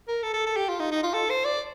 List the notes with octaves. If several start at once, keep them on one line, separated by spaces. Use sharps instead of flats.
A#4
A4
A4
A4
G4
F4
D#4
D#4
F4
A4
C5
D5